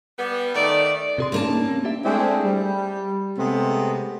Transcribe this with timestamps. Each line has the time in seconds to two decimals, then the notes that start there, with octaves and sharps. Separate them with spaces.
0.18 G3 B3
0.54 D#3 A3 D5
1.18 C3 G#4 C6
1.32 C#3 G3 A3 A#3 D#4 A5
1.68 C4
1.84 D4 G4 E5
2.05 G#3 A3 C4 D4 E4 G#4
2.45 G3
3.38 C3 G#3 A3 B3 C4